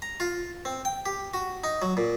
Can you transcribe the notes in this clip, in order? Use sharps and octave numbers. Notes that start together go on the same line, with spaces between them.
A#5
F4
C4
G5
G4
F#4
D#4
F#3
A#2